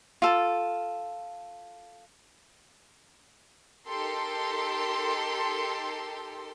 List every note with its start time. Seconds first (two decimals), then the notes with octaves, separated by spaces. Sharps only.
0.22 F4 A4
3.88 D#4 G4 A4 A#4 C6